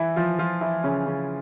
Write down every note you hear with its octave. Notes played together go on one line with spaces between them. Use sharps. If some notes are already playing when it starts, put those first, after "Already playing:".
Already playing: E3 E4
F3 F4
F3 F4
E3 E4
C#3 C#4
C#3 C#4